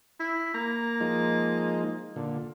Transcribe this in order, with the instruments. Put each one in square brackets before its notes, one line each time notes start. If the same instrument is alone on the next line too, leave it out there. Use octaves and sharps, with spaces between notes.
[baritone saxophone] E4
[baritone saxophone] A#3 [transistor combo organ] A#5
[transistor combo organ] F3 G#3 D#4
A#2 D3